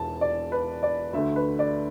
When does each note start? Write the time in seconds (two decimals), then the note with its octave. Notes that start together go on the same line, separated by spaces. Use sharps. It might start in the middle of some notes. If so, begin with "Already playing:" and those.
Already playing: E1 E2 E3 A5
0.21 D5
0.52 B4
0.83 D5
1.13 D2 D3 A3 E5
1.36 B4
1.59 D5